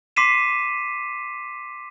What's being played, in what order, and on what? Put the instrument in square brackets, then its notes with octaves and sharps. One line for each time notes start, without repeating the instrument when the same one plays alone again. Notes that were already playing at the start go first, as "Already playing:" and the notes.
[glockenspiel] C6 D6 B6 C7 D#7 E7